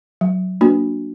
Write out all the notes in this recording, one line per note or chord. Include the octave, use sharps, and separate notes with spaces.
F#3
A#3 D4 F#4